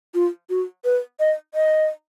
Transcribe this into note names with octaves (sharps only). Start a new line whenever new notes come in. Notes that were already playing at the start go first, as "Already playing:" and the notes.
F4
F#4
B4
D#5
D#5